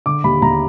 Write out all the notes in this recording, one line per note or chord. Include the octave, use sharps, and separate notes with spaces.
D3 D6
D#2 B5
D#2 A#5